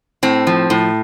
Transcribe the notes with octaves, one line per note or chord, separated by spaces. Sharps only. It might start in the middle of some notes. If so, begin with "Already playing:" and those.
A2 C4
F3
A2